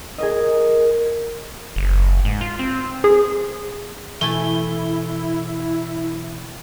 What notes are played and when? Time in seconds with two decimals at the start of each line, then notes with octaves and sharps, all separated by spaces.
0.18 G#4 A#4 D#5
1.76 F#1
2.25 G#2
2.41 F4
2.59 C4
3.04 G#4
4.21 B2 E3 A3 E4 G#5 A5 G7